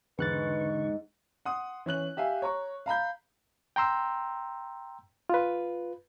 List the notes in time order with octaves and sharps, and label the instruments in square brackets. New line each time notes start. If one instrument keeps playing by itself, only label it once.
[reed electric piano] E2 F#6 A6 [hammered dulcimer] G#2 [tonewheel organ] D3 C#6 [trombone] B4
[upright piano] F#5 C6 D#6
E3 C#4 F#6 F#7
G4 E5 F5 G#5
C#5 A#5 C#6
F5 A#5 B5 G6
[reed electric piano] G5 A#5 C6 E6
F4 B4